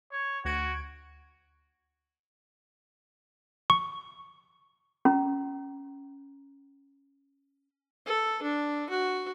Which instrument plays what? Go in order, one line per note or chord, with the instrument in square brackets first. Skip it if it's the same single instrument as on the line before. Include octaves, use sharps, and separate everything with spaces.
[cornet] C#5
[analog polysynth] D2 G#6 D7 [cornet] F#4
[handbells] C#6
[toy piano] C#4 A#5
[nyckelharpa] A4
D4
F#4